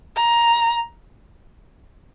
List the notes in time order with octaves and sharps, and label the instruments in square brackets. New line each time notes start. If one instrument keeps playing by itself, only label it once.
[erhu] A#5